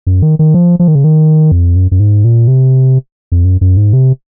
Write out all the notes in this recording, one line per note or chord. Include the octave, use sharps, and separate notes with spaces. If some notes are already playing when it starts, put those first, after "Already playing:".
F#2
D#3
D#3
F3
F3
D#3
C#3
D#3
F2
F#2
F#2
G#2
A#2
C3
F2
F#2
F#2
G#2
C3